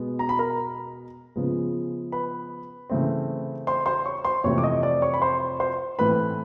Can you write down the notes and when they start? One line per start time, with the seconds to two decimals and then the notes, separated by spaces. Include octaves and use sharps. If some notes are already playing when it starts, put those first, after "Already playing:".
Already playing: B2 G#3 B3
0.19 A#5
0.29 B5
0.39 A#4 A#5
1.36 C#3 F3 G#3 B3
2.12 B4 B5
2.90 C#3 E3 A3 C4
3.67 C5 C6
3.86 C5 C6
4.06 C#5 C#6
4.25 C5 C6
4.44 F2 C3 E3 A3 C4 C#5 C#6
4.58 D6
4.63 D#5 D#6
4.83 D5 D6
5.02 C#5 C#6
5.14 B5
5.22 C5 C6
5.60 C5 C6
5.99 A2 E3 A3 C4 B4 B5